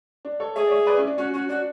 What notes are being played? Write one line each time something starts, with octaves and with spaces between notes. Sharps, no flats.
D4
A4 C#5
G#4 C#5 E5
D5
C#5 E5
B4 D5
C#4 E4
D4
C#4 F#4
C#4 F#4
D4 F#4